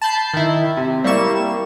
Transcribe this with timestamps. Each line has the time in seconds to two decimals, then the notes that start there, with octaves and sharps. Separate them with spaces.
0.02 A5 B5 G6 C7
0.34 D#3 E4
0.77 C3
1.04 G3 A#3 E4 C#6 E7